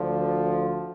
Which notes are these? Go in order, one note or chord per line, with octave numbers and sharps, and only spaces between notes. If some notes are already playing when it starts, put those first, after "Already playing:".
Already playing: D2 D3 F3